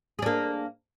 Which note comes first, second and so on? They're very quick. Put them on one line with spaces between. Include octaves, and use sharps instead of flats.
G#4 D4 A#3